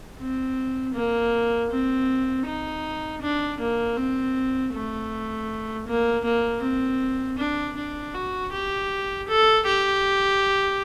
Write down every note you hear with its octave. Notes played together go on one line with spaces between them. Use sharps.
C4
A#3
C4
D#4
D4
A#3
C4
A3
A#3
A#3
C4
D4
D4
F#4
G4
A4
G4